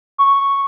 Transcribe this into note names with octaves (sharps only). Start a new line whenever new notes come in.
C#6